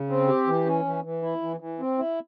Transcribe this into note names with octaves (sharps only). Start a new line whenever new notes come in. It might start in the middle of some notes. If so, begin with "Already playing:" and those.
Already playing: C#3
C4
G4
E3
C#4
E3
E3
E4
E3
E3
C4
E4